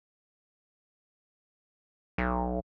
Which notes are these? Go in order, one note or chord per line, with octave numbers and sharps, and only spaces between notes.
B1